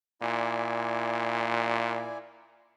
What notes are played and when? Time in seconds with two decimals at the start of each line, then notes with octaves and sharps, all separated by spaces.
0.22 A#2 E4 D5 G#5